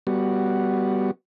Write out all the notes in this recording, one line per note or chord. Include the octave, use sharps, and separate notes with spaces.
G3 B3 F#4